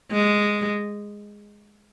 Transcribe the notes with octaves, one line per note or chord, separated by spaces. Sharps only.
G#3